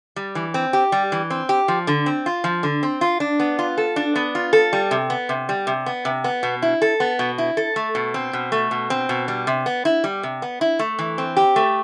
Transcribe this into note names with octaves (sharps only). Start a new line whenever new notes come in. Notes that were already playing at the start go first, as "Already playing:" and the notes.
G3
E3
C4
G4
G3
E3
C4
G4
F3
D3
C4
F4
F3
D3
C4
F4
D4
B3
F4
A4
D4
B3
F4
A4
G3
C3
B3
C3
G3
C3
B3
C3
B3
B2
E4
A4
B3
B2
E4
A4
A3
B2
C4
B2
A3
B2
C4
B2
G3
C3
B3
E4
G3
C3
B3
E4
A3
E3
C4
G4
A3